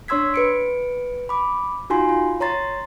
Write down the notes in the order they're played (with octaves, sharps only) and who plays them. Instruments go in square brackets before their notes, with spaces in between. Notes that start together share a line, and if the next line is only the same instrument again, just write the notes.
[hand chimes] D4 C#5 C6 E6 G#6 B6
B4 C#7 D7
B5 D6
D#4 F4 F#4 G#5 C6
F4
C#5 A#5 C6 A6